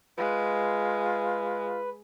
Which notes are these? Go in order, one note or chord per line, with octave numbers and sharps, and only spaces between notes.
G#3 F4 B4